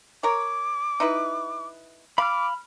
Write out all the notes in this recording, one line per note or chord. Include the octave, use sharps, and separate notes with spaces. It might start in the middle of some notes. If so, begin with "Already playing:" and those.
A#4 C#5 D6
D#4 E4 B4
F5 B5 D6 F6